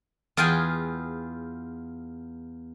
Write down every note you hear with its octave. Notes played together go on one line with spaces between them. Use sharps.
E2 F4 G#4 G5 G#5